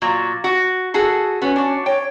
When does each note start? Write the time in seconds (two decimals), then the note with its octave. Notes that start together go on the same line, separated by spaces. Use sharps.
0.02 A#2 F#3
0.44 F#4
0.94 F#4 G#4 A4
1.42 B3 C#4 F#4
1.56 D4 F#4
1.86 C#5 G5